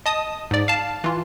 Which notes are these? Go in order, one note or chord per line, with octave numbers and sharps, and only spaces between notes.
D#5 A5 D#6
G#2 D5
F5 A5
E3 F4